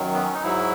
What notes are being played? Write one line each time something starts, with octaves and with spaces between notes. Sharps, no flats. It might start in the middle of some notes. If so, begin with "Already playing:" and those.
Already playing: F#2 D#3 F#3
B3
C#4
D#4
G#2 F#3 E4